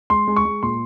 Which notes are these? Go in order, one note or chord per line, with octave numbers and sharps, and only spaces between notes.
G#3 C6
G#3
C#6
G#3
A#2 C6